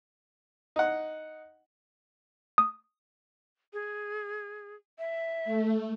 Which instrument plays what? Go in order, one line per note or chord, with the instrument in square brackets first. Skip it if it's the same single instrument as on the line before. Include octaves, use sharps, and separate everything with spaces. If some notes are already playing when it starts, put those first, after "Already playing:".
[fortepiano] D#4 F#5
[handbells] D#6
[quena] G#4
E5
[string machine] A3